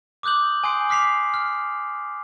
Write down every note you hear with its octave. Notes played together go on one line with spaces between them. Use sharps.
D6 D#6 F#6 G6 F#7
G#5 C6 D#6 G6 C7 D7
D6 F6 B6 C7 F7
F6